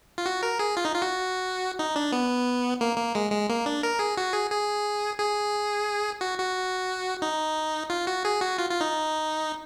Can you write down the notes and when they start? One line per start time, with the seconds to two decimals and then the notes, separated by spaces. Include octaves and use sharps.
0.18 F4
0.26 F#4
0.43 A#4
0.59 G#4
0.77 F4
0.85 D#4
0.94 F4
1.02 F#4
1.79 D#4
1.96 D4
2.12 B3
2.81 A#3
2.97 A#3
3.15 G#3
3.31 G#3
3.49 A#3
3.66 D4
3.83 A#4
3.99 G#4
4.17 F#4
4.33 G#4
4.50 G#4
5.19 G#4
6.21 F#4
6.38 F#4
7.22 D#4
7.90 F4
8.07 F#4
8.25 G#4
8.41 F#4
8.59 F4
8.70 F4
8.81 D#4